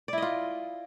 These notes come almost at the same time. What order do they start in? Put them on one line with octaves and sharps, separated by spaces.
D5 E4 D#5 F4